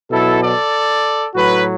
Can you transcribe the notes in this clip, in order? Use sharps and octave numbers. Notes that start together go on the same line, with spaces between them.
B2 F#3 E4 A4
A4 D5
A2 F#3 F#4 B4